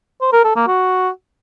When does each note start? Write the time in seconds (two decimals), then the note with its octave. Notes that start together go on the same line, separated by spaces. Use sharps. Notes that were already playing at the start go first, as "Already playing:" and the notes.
0.21 C5
0.33 A#4
0.44 A4
0.56 A#3
0.67 F#4